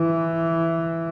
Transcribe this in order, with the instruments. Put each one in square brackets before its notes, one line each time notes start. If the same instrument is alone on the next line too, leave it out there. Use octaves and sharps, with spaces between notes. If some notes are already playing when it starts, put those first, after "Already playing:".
Already playing: [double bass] E3